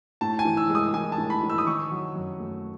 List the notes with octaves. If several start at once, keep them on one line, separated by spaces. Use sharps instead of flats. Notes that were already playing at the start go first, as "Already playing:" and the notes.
A2 A5
G#5
E3
E6
G#3
D#6
E3 G#5
A5
A2
B5
E3
E6
D#6
D#3 C#6
F#3
F#2
A3